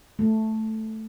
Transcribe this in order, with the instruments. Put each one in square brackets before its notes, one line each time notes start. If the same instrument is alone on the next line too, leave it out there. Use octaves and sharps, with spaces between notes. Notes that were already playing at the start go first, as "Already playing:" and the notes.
[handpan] A3